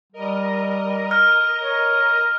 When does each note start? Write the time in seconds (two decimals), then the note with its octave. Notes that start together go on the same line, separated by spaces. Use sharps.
0.13 G3 A#4 D#5
1.11 F6
1.61 C#5